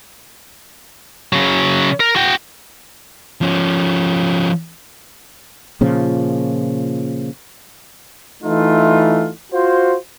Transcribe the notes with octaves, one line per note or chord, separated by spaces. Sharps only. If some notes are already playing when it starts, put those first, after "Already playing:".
C#3 F#3
A#4
F#4 G5
F3 C#4
A#2 C#3 F3
E3 A3 D#4 F4
F4 F#4 C5